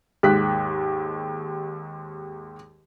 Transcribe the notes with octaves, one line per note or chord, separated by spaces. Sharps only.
D#2 G#2 G4 F#6 B6